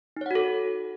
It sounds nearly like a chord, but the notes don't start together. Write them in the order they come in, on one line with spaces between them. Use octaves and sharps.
D#4 C#5 F#5 F#4 A4